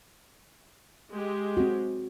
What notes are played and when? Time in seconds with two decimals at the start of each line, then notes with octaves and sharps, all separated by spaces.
1.11 G#3 G4
1.57 C4 F#4